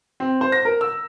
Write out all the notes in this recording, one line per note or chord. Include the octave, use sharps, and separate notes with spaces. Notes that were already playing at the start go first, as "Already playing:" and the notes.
C4
C5
A#6
A#4
E6